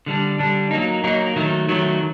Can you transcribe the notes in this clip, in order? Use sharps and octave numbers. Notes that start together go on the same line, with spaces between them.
D3 G3 D4
D3 G3 D4
F#3 A#3 D#4
F#3 A#3 D#4
D#3 F#3 A3
D#3 F#3 A3